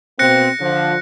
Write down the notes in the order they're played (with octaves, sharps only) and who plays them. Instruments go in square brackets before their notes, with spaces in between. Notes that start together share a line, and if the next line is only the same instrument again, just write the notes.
[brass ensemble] B2 A#3 C4 [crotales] F#6 A#6 C#7
[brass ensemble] D3 F3